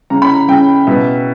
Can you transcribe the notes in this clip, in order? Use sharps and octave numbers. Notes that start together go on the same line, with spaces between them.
C#3 A#5
B5
A#5
C#3 G5
B2 E5